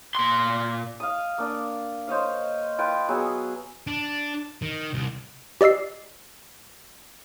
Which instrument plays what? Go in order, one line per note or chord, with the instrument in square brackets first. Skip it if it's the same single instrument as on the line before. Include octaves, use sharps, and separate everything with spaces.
[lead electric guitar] A#2 C6
[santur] F5 D#6
A#3 D4
C5 C#5 D#5 F5
F4 B4 G5 C6
F#3 B3 G#4 E6
[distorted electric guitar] D4
D#3
C2
[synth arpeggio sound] G4 D5 D#5 E6 C7